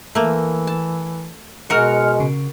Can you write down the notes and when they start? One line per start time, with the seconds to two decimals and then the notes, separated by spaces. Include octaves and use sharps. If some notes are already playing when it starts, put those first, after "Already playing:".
0.15 E3 A3 A#3
0.67 A5
1.70 B2 G#3 F#4 A#4 F6 C#7
2.20 C#3